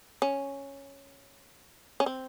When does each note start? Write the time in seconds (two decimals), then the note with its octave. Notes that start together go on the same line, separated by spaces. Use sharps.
0.22 C#4
2.00 C#4
2.06 C4